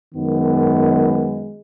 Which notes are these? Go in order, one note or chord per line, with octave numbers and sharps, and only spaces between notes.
F#2 D#3 G#3 B3